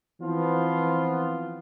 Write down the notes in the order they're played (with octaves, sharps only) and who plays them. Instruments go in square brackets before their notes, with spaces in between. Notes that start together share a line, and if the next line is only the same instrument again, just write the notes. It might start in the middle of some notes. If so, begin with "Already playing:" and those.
[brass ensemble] E3 F3 B3 C4 F4